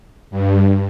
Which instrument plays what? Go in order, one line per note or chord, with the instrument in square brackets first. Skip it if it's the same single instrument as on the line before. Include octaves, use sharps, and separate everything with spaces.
[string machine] G2